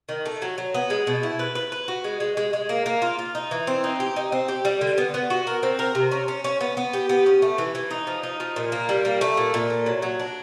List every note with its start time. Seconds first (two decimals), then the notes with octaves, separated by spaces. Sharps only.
0.09 D#3
0.26 A3
0.42 F#3
0.58 F#3
0.74 B3
0.90 G#3
1.07 B2
1.23 E4
1.39 B4
1.55 B4
1.72 B4
1.88 F#4
2.04 G#3
2.20 G#3
2.37 G#3
2.53 G#3
2.69 A#3
2.86 A#3
3.02 F4
3.19 F4
3.35 D#4
3.51 E3
3.67 C4
3.84 D#4
4.00 G4
4.16 D#4
4.32 C4
4.48 G4
4.65 G3
4.81 D3
4.98 B3
5.14 B3
5.30 F#4
5.47 A#4
5.63 C4
5.79 A#4
5.95 C3
6.11 C#4
6.28 C#4
6.44 C#4
6.61 B3
6.77 B3
6.93 G4
7.09 B3
7.26 C#4
7.42 A3
7.58 E3
7.75 E3
7.91 D#4
8.07 F3
8.23 D#4
8.40 F3
8.56 A#2
8.72 A#3
8.89 G3
9.05 A#3
9.21 A3
9.37 A#2
9.54 A#2
9.70 A3
9.86 F#3
10.02 F#3
10.20 D4